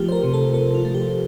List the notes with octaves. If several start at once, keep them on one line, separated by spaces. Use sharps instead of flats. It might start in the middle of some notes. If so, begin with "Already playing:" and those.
Already playing: F3 A3 F4 G4
C5
A#4
C3
A4
C3 A4
F4
A3
G4